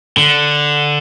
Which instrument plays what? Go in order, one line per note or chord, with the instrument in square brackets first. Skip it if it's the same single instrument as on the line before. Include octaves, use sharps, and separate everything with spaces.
[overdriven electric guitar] D3